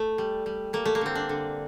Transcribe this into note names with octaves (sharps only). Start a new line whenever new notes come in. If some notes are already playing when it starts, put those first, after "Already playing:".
Already playing: A3
G3
G3
A3 A#3
A3
A#3
D3 C4
D4
D3